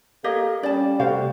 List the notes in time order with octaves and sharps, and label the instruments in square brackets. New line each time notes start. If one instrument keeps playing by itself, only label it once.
[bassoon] A#3 [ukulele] G4 C#5 D#5 [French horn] A4
[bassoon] G3 [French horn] C#4 [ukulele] D5 A5
[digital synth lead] C3 [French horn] A3 [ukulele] F#4 C5 F5